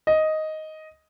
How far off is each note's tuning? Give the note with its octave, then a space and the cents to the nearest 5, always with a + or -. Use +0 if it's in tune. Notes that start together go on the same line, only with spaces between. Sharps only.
D#5 +5